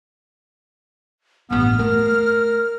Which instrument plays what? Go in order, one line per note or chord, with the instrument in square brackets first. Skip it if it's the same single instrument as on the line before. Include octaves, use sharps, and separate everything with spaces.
[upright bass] A1 G2 [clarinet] B3 [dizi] F6
[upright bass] A3 [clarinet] A#4